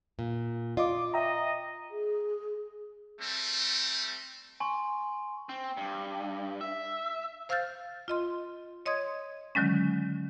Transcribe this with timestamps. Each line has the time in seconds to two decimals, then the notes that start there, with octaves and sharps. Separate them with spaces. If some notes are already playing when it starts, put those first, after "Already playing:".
0.19 A#2
0.77 F4 D5 D#5 D6
1.14 D#5 E5 G5 A#5
1.91 G#4
3.21 G3 A3 C4
4.60 G#5 C6 C#6
5.49 C4
5.77 G2
6.61 E5
7.49 C5 F5 E6 F6 G6 A6
8.08 F4 D#5 C6
8.86 C#5 D#5 C6 D#6 G#6
9.55 D3 D#3 F#3 G#3 C#4